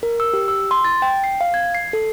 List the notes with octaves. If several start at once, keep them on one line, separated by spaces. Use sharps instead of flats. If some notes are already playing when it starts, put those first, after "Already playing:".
A#4
E6
G4
E6
C6
A6
G5
C7
F5
G#6
C7
A4